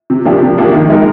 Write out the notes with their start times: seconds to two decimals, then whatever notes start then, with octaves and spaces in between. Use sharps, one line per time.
0.10 C3
0.25 F3 A#3 D4 G4
0.41 C3
0.58 F3 A#3 D4 G4
0.73 D#3
0.89 G#3 D#4 A#4